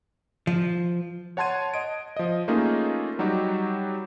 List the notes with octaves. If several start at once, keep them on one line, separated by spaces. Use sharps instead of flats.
F3
C#5 F#5 A5 C6 G#6 D#7
D#5 D7
F3 D#5
A3 A#3 C#4 D#4 F4 G#4
F#3 G3 D#4 F#4 G4